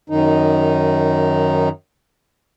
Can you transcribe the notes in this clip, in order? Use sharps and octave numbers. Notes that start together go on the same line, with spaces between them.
F#2 D#3 D#4